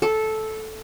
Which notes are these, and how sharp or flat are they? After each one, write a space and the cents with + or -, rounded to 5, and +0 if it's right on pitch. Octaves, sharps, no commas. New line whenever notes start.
A4 -10